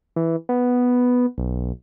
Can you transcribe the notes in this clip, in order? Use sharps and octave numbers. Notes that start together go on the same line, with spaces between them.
E3
B3
B1